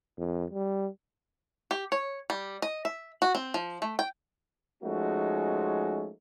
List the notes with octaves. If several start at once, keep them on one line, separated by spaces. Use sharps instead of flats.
F2
G3
G4
C#5
G3
D#5
E5
F#4
C4
F3
A3
G5
F3 G#3 A3 C#4 D#4 F#4